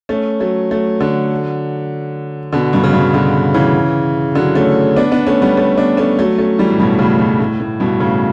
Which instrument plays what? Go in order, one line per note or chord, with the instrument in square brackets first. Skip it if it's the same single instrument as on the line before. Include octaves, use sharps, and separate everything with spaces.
[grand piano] A3 C#4
F#3 A3
F#3 A3
D3 F#3
B2 D3
G2 B2
C#3
G2 B2
B2 D3
C#3 E3
D3 F#3
A3 C#4
B3 D4
B3 D4
A3 C#4
G3 B3
A3 C#4
B3 D4
A3 C#4
F#3 A3
A3 C#4
E3 G3
A2
G2 B2
A2 C#3
G2 B2
A2
A2
G2 B2
A2 C#3